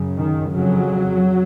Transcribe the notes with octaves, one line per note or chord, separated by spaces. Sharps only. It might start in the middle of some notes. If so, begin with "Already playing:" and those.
Already playing: F#2 C#3
D#3
F2 C#3 F#3